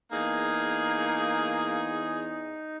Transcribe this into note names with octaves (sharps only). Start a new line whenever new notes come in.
E2 A#3 D#4 G#4